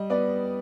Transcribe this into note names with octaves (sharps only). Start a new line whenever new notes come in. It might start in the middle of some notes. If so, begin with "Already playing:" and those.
Already playing: G3 D#5
B3 D5